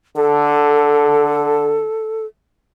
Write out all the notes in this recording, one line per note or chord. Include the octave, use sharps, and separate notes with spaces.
D3 A4